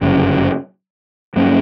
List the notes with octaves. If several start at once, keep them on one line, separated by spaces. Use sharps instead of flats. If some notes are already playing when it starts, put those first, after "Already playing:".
G1 F#2 C#3 G3
G2 F#3 A#3 C#4